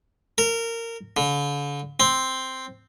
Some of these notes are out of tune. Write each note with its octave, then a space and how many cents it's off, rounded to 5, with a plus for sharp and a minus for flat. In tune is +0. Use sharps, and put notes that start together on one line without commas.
A#4 -20
D3 -40
C4 +0